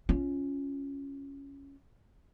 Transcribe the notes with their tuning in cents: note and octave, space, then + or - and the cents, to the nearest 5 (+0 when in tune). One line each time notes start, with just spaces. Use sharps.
C#4 +0 F4 -5